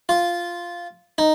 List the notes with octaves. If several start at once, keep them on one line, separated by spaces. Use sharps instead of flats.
F4
D#4